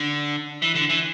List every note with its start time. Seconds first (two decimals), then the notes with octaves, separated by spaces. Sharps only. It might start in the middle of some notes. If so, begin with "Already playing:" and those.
Already playing: D3
0.62 E3
0.75 D3
0.89 E3